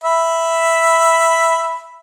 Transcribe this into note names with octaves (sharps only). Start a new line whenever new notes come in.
E5 B5